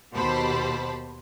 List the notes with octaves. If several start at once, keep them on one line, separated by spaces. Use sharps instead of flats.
D#2 B2 G4 C5 A5 B5